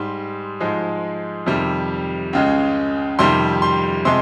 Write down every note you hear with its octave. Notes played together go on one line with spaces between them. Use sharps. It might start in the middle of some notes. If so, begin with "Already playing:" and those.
Already playing: G#2 G3 C6
G#2 F3 G#3
F2 C3 D#3 G3
C#2 C#3 G#3
F2 C3 D#3 G3 C6
C6
C3 F3 G#3 C6